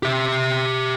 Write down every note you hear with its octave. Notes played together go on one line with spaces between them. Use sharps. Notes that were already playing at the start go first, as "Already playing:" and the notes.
G4 E5